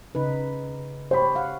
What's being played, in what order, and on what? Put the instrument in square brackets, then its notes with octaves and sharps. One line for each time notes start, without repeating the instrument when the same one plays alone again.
[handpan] C#3 D#4 B4
[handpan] G4 C#5 [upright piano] C5 B5
[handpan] F5 F#5